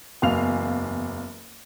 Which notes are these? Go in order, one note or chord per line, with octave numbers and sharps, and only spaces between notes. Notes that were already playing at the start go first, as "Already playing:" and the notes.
F#1 E2 F5 F7